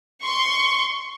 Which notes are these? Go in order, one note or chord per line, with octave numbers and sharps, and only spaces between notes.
C6 C#6